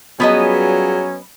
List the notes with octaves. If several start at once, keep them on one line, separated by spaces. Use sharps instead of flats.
F#3 G3 B3 C#4 F4 G#4 B4 D#5